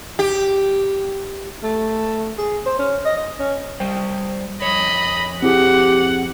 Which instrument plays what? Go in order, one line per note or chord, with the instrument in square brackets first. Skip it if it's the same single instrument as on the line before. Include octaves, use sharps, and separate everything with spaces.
[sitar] G4
[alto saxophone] A3
G#4
C5
C#4
D#5
D#5
C#4
[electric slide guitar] G3 C5 G5
[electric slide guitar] F2 C#5 [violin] D#5 B5
[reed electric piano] C4 E4 G#4 [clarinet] G4 [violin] F#5